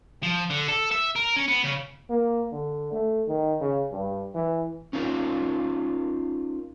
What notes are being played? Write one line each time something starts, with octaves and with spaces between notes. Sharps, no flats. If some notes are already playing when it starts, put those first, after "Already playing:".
F3
D3
A4
E5
A#4
C#4
B3
C#3
A#3
D3
A3
D#3
C#3
G2
E3
C#4 D#4 F4 A#4